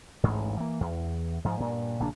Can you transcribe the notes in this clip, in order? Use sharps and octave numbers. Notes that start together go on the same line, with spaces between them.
A1 D2 G#2
E3 A#3
E2
G#2 F3 G#3
G2 A#2
A#1 C#3 A#3 D4